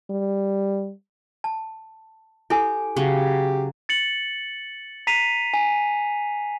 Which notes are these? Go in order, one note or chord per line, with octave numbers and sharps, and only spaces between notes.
G3
A5
E4 G4 A4 G#5
C#3 F#3 G4
A6 C#7 F#7
A#5 B6 C7 D#7 F7
G#5